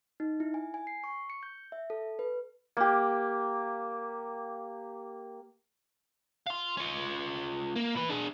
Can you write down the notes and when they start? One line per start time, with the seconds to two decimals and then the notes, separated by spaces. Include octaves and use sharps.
0.20 D#4
0.40 E4
0.54 G#5
0.74 G#5
0.87 C7
1.04 C#6
1.30 C#7
1.43 G6
1.72 E5
1.90 A4
2.19 B4
2.77 A#3 G4
6.47 F5 C6
6.77 C#4 F4
7.76 A#3
7.95 E4 B4
8.09 D4 G#4